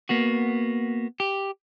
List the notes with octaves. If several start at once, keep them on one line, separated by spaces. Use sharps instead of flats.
A#3 B3 F#4
G4